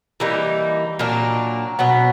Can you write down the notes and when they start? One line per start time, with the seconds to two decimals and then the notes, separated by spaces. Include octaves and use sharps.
0.20 E3 G3 A#3 D#4
0.99 A#2 F#3 A#3 D4
1.79 B2 F#3 B3